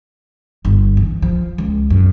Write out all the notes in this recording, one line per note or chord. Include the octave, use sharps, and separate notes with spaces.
G1
E3
F3
C#2
F#2